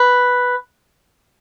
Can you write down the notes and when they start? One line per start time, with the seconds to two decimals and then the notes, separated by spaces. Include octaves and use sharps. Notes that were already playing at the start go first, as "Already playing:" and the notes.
Already playing: B4